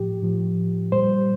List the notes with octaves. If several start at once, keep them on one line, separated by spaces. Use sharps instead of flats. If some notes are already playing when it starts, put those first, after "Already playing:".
Already playing: A2 F3 G4
A2 F3
A#2 G3 C5